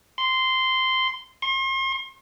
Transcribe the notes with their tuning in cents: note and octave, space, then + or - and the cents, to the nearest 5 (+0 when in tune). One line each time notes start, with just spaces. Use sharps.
C6 -10
C6 +40